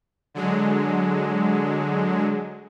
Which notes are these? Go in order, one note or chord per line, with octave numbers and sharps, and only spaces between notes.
D3 F#3 G#3